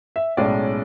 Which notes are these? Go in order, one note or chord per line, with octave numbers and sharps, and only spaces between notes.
E5
B1 A2 G#3 C#4 D5